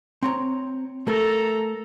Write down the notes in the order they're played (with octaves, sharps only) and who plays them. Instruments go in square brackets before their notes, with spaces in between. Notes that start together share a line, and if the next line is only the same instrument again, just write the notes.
[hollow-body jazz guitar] C4 C#5 A#5
[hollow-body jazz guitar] A3 A#4 [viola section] A4 A#5